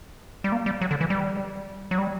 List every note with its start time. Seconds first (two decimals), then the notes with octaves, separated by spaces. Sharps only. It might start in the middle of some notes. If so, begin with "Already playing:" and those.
0.44 G3
0.52 A#3
0.66 G3
0.81 F#3
0.91 D3
1.01 E3
1.10 G3
1.91 F#3
1.98 G3